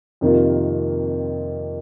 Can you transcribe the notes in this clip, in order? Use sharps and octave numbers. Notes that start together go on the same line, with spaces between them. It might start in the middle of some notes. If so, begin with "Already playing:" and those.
F2 C3 D#3 A#3 F4